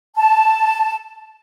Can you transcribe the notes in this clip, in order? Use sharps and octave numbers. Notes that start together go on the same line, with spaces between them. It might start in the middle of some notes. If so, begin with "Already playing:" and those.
A5